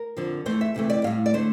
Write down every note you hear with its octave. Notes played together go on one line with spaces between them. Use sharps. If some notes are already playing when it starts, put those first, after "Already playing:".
Already playing: A#4
F2 D3 F3
E2 E3 A3 C5
E5
D2 C3 E3 A3
D5
A2 G3 F5
D5
D3 A3 C5